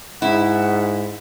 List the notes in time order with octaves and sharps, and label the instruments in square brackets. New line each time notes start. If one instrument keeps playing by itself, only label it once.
[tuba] G#2 [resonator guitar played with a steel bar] E4 [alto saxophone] F#5